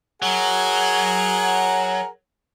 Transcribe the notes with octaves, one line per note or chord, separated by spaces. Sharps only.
F#3 G#4 A#4 F#5